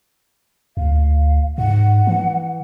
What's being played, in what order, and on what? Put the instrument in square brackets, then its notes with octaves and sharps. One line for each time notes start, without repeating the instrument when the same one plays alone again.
[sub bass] D2 [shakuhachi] F5
[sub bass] G#2 [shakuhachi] F#5
[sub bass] E3